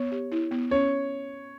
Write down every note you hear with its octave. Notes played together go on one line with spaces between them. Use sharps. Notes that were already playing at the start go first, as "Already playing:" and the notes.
Already playing: B3 C#5
G4
E4
B3
C#4 C#5